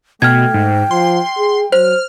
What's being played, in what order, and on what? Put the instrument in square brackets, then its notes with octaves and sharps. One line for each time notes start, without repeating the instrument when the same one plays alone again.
[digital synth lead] B2 [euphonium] A3 [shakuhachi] G5 [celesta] F6 G#6
[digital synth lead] G#2
[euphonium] F3 [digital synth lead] C6
[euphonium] G#4
[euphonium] F#3 [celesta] C5 [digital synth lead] F6